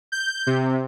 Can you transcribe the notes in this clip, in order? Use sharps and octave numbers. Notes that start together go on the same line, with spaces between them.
G6
C3